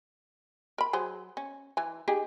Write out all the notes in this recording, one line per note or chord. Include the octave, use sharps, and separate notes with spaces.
A#4 B5
F#3 G#4 C5
C#4
E3 G#5
D#4 G4 G#4